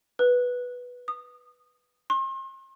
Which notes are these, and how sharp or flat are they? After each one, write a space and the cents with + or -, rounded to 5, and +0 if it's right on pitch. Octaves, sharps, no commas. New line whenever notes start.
B4 -5
D#6 -20
C6 +40